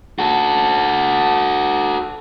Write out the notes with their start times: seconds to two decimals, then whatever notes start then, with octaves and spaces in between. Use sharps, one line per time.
0.19 F#4 A4